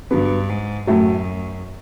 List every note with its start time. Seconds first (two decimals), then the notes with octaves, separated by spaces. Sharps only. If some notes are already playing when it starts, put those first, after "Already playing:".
0.11 G2 D3 F#3 B3
0.50 G#2
0.87 F#2 A2 F#3 A3